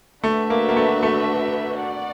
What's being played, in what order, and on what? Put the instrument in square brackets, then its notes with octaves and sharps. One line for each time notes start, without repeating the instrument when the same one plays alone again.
[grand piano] A3 [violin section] D4 F#4 B4 E5
[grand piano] A#3
A#3
A3
A3
[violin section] D5 F#5